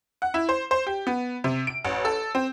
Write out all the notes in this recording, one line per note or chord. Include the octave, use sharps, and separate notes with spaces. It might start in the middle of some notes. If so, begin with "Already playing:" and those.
F#5
E4
C5
C5
G4
B3
C3
D7
A1
A4
C4